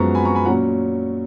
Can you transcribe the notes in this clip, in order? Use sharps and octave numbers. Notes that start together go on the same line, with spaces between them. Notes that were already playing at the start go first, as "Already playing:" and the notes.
Already playing: F#2 F3 G#3 B3 A#5 C#6
G#5 B5
A#5 C#6
G#5 B5
A#2 F#3 C#4 F#5 A#5